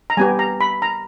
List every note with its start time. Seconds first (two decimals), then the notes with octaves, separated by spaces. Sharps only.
0.10 A#5
0.17 G3 B3 G4 G#5
0.39 A#5
0.61 B5
0.82 A#5